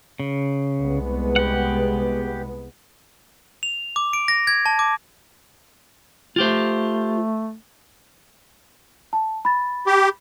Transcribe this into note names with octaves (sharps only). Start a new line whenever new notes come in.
C#3
C2 G#3 B3
G4 F#5
F7
D6
D7
A#6
G#6
A5
D6
A3 F4 G4 C5
A5
B5 A6
G4